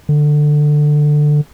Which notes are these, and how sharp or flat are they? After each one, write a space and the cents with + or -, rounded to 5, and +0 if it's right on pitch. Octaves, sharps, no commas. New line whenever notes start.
D3 +15